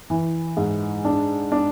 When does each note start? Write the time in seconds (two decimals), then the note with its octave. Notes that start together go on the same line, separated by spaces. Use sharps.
0.10 E3
0.57 G#2
1.05 D4
1.52 D4